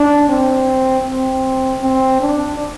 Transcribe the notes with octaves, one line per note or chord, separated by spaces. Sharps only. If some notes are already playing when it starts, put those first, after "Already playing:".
Already playing: D4
C4
C4
C4
D4